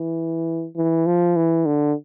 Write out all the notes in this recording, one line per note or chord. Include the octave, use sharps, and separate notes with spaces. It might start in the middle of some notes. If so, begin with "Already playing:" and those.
Already playing: E3
E3
F3
E3
D3